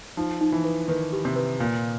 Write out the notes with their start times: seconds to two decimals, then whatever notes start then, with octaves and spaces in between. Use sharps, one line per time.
0.17 F3 D#4
0.41 D#4
0.52 E3
0.64 B4
0.88 D#3 B4
1.13 G4
1.25 C3
1.36 B4
1.60 A#2 F5